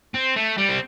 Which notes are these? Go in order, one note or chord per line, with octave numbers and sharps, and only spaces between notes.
C4
A3
G3
C4